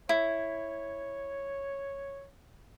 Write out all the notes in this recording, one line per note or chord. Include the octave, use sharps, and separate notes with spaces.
E4 C#5